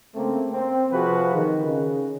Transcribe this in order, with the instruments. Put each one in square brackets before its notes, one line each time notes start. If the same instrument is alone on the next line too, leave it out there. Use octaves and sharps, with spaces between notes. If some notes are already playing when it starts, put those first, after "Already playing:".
[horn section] C#3 A3 A#3 C4
C4
C3 F3 F#4 G#4 B4
D#3
C#3